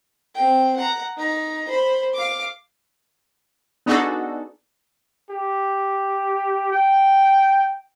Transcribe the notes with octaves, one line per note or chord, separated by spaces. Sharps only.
C4 G5
F#5 A#5
D#4 A#5
C5 B5
F5 D6
B3 D4 D#4 F#4 G#4 A4
G4
G5